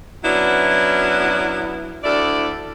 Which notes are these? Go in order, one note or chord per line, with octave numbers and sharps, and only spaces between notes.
F#3 B3 C#4 D4 E4
D2 E4 A4 D5